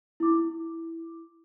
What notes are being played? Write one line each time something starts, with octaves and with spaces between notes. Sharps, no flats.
E4 D6